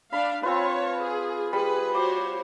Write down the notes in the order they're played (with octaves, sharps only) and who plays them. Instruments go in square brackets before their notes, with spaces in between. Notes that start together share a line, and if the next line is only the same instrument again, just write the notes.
[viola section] D4 F5 [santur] B5
[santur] C4 F4 B4 [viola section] C#5 A5
[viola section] G#4
[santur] G3 [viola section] G#4 B4
[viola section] F#4 C5 C#5 [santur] D6